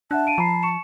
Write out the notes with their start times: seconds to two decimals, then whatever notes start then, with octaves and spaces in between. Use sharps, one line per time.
0.11 D4 E5 F#5 A5 F#6
0.26 F5 D7 D#7
0.38 F3 A#5 B5 C7
0.63 C#6 C#7 E7